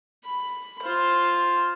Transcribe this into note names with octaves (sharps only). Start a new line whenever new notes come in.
B5
F4 C5